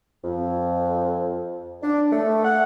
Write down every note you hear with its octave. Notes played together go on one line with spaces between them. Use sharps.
F2
D4
A3
F#5